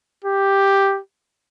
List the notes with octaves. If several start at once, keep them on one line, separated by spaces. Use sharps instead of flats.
G4